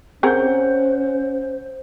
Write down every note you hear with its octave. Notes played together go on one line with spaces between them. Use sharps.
C4 C#4 G#4 A#4 C5 F#5 G6